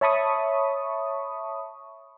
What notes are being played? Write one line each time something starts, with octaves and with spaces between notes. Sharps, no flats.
C#5 E5 A5 B5 C#6 D#6